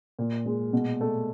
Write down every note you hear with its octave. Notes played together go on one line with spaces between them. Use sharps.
A#2
G#3
B2
A3